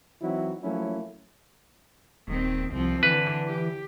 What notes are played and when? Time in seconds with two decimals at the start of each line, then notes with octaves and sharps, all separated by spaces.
0.22 E3 F#3 C4 D#4 E4 F#4
0.62 F3 F#3 A3 A#3 C#4 E4
2.28 D#1 D#3 C4
2.72 C2 F3 C4
3.03 D3 E3 B4
3.47 G4